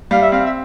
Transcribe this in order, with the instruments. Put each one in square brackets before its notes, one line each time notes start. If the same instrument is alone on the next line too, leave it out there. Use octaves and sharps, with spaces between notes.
[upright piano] G3 [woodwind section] F5
[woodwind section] E5
[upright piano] C4 [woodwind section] F5
[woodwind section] E5